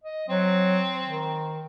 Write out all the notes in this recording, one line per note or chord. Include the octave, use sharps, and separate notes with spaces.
D#5
F#3 C4
D#3